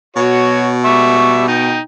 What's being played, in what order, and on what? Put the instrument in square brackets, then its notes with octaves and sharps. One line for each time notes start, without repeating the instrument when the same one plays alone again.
[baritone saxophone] B2 [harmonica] F#4 C#5
[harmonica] G3 E5 C#6
D#4 G5